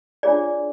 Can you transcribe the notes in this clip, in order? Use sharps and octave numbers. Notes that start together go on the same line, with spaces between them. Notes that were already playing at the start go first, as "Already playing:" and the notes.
D4 F4 G#4 C#5 D5